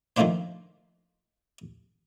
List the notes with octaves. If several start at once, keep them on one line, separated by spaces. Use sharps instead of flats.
D#3 F3 A3 A#3 D4 C5